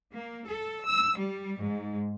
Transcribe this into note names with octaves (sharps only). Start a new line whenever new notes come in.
A#3
A4
E6
G3
G#2